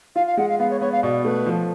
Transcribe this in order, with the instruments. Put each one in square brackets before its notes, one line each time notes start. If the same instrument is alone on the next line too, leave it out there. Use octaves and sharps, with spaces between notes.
[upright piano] F4 [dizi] F5
[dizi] F5
[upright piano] G#3 [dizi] F#5
[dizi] F5
[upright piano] B3 [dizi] F5
[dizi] C#5
[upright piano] B3 [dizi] C#5
[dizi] F5
[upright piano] B2 [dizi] D5
[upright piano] A3 [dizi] B4
[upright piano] F3